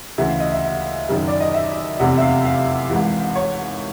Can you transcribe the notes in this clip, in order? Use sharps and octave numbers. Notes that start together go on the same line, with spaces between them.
D2 C#3 E3 E5
F5
D#5
E5
E5
F#1 F#2 D#3
D5
D#5
E5
F1 E2 C3 F#5
E5
F5
F5
G#1 G#2 E3
C#5